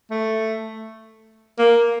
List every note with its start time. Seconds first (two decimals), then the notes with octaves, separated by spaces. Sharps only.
0.10 A3
1.58 A#3